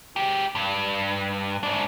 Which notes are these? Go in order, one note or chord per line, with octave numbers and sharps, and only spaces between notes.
G#3 G4
G2
G#2 D4